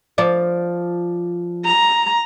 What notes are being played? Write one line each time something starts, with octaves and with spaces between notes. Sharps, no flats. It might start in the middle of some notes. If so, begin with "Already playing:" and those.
F3 D5
A#5